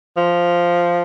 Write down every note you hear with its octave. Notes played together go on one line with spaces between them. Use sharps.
F3